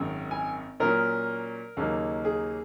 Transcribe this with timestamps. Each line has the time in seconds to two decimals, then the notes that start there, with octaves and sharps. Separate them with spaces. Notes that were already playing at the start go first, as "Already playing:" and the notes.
Already playing: G#1 F#2 D#3
0.31 G#5
0.80 A#2 F#3 C#4 A#4
1.77 D#2 C#3 F#3 A#3 D#4
2.25 G#4